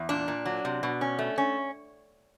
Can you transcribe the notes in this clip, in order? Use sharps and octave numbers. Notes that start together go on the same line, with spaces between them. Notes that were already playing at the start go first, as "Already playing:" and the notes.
Already playing: E2
A#2 D4
A#2
F#3
C3
B2
C#4
A3
C#4